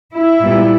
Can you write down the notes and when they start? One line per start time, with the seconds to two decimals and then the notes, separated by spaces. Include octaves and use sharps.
0.11 E4
0.41 A#2 G3 B3